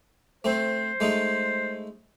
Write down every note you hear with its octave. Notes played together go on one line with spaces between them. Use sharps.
A3 C4 C5
G#3 A3 D#4